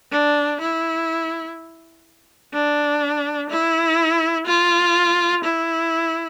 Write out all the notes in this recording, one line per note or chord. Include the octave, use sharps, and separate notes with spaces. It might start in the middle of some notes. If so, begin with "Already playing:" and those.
D4
E4
D4
E4
F4
E4